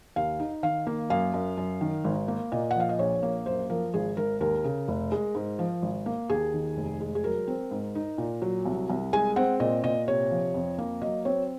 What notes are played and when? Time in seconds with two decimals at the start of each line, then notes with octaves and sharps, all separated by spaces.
0.16 D#2 F5
0.40 D#4
0.63 D#3 F5
0.87 A#3
1.10 F#2 F5
1.34 F#2
1.58 F#2
1.81 D#3
2.04 G#1
2.28 A#3
2.52 A#2 D#5
2.71 F#5
2.76 F3 F5
2.89 D#5
2.99 A#1 C#5
3.23 A#3
3.46 F#2 C5
3.70 F3 A#4
3.94 G#1 G#4
4.17 G#1 A#4
4.40 D#2 A#4
4.65 C#3
4.88 F1
5.12 G#3
5.35 G#2
5.59 F3
5.82 G#1
6.06 A#3
6.30 D#2 G#4
6.54 D#3
6.77 F1
7.00 G#3
7.15 G#4
7.24 F#3 A#4
7.47 C4
7.71 G#2
7.95 D#4
8.18 A#2
8.42 F#3
8.65 C2
8.90 C2
9.13 G#3 G#5
9.36 C4 F#5
9.60 A#2 D#5
9.84 A#2 D#5
10.08 C3 C#5
10.31 F3
10.54 F2
10.78 A#3
11.02 F#3 D#5
11.25 C4 C#5